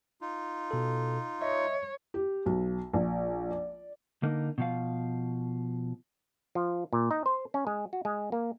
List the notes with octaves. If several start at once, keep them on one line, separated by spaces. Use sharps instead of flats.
D#4 F4
B2 A4
C#5 D#5 E5
G4
B1
A#1
D5
D3 A#3 D#4
B2 F3 F5
F3
A#2
D#4
C5
C#4
G#3
F#4
G#3
A#3